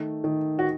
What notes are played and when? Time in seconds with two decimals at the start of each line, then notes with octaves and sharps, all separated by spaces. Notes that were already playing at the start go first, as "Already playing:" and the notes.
Already playing: D#3 A3
0.24 D#3
0.59 F#4